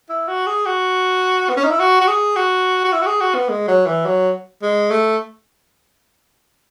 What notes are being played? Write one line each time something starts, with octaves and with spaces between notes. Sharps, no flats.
E4
F#4
G#4
F#4
B3
C#4
D#4
E4
F#4
F#4
G#4
F#4
F#4
E4
F#4
G#4
F#4
B3
G#3
F#3
E3
F#3
G#3
A3